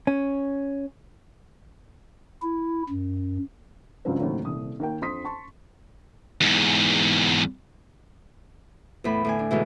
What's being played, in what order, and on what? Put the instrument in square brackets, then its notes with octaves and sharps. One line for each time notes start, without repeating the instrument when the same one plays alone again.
[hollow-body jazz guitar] C#4
[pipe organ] E4
F#2
[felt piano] C#2 G2 C#3 F3 F#3 C4
D#2 A2 C#3 F#3 A3 C4
D#1 C2 D#6
D#2 A#3 G5
F2 D4 C6 D#6 B6
A5 C6 C#6
[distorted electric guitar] E2 G#2
[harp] E2 A2 B5
A2 D3 G#5
D4
G#2 B2 D3 E3